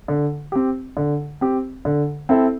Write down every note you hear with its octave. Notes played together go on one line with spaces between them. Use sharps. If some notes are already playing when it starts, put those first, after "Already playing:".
D3
C4 G4
D3
C4 G4
D3
C4 E4 A4